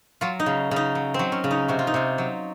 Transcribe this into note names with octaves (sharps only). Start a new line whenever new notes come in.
F#3 F4
D#4
C#3
C#3 D#4
F#3
F#3 C4
C#4
C#3
D#4
C3 F#4
F4
D#4
C3 F4
F#3